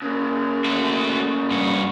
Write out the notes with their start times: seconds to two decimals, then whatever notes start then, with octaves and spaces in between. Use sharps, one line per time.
0.02 C#3 A#3
0.65 A3 F#4
1.51 G2 F#4